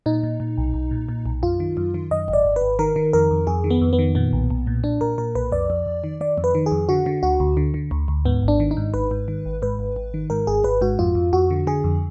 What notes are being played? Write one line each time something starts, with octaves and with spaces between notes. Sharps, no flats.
A#2 D#4
A#2
A#2
B1
B1
A#2
A#2
B1
F#2 F4
D#3
F#2
D#3
F#2 D#5
G#1
D5
G#1
B4
G#1
D#3 A#4
D#3
F2 A#4
F2
F2 G#4
D#3
B3
F2
B3
D#3
A#2 B3
B1
B1
A#2
A#2 D4
A#2 A#4
A#2 A#4
B1 B4
F2 D5
F2
F2
D#3
D#3 D5
F2
B4
D#3
G#4
F2
D3 F#4
D3
D2 F#4
D2
D3
D3
D2
D2
G#2 B3
G#1
D4
D#3
D#4
G#2
G#1 B4
G#2
D#3
G#1
G#2 B4
G#1
G#1
D#3
G#2 A#4
G#1 G#4
G#1 B4
G#2 F#4
F2 F4
F2
F2 F#4
D3
D3 G#4
F2